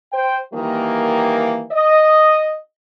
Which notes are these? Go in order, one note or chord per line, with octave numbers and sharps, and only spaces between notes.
C5 G5
D#3 E3 G3 A#3
D#5